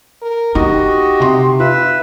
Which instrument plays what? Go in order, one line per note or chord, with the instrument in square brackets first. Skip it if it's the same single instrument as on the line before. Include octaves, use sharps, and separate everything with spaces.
[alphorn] A#4
[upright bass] D#4 [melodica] F#4 D#5 [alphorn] G4
[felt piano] C3 C6
[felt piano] F4 [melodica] B4 E5